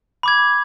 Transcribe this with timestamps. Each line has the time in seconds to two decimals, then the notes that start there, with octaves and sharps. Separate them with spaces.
0.23 B5 D6 G#6